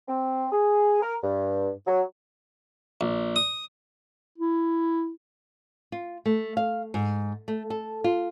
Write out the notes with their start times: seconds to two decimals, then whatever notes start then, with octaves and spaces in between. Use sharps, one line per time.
0.08 C4
0.52 G#4
1.02 A#4
1.23 G2
1.87 F#3
3.01 A#1
3.36 D#6
4.38 E4
5.92 F4
6.26 A3
6.57 F5
6.94 G#2
7.48 A3
7.70 A4
8.04 F4